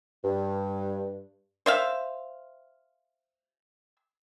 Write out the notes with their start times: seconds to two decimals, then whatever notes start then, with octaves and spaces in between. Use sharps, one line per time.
0.24 G2
1.66 C5 E5 F5